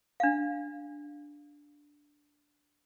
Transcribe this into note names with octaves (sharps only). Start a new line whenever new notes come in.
D4 F5